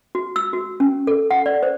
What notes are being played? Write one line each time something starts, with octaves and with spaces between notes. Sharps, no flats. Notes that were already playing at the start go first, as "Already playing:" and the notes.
F#4
E6
F#4
C#4
A4
F#5
D5
C5